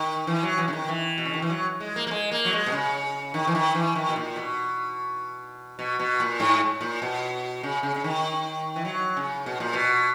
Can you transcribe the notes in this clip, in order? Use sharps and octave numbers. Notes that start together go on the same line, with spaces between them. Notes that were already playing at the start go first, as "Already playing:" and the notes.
Already playing: D#3
E3
F#3
E3
C#3
D#3
E3
B2
C#3
D#3
E3
F#3
G#3
A#3
A#3
G#3
A#3
F#3
G#3
B2
C#3
D#3
E3
D#3
E3
D#3
B2
A#2
B2
B2
B2
A#2
G#2
A#2
B2
C#3
C#3
C#3
D#3
E3
F#3
C#3
B2
A#2
B2